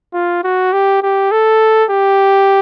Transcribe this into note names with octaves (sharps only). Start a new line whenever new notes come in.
F4
F#4
G4
G4
A4
G4